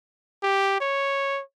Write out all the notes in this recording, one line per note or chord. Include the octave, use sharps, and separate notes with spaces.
G4
C#5